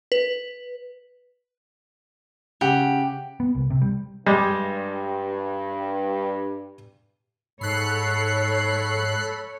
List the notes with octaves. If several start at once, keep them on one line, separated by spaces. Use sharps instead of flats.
B4
C#3 G4 F#5
B3
C2
C3
G3
G2 G3 G#3
G#2 A4 C#5 B5 F#6 C7